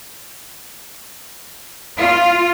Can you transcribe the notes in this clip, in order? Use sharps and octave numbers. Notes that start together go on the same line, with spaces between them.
F4